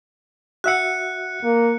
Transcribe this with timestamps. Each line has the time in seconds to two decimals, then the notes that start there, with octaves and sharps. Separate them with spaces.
0.64 F#4 E5 F#5 F#6 C#7
1.44 A#3